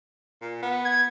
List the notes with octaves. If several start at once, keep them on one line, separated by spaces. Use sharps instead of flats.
A#2
B3
G#6